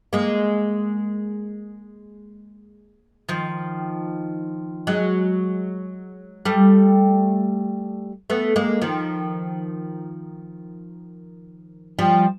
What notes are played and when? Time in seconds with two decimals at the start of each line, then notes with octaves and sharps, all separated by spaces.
0.13 G#3 A#3
3.29 D#3 F3
4.87 F#3 G#3
6.45 G3 A3
8.30 A3 B3
8.56 G#3 A#3
8.82 D#3 F3
11.99 F3 G3